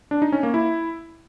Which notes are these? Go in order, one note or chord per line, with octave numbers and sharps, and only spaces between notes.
D4
D#4
C#4
A#3
E4